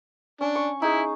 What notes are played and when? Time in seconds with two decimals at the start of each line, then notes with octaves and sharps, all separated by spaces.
0.41 C#4 D4
0.55 C#6
0.82 D#4 E4 G#4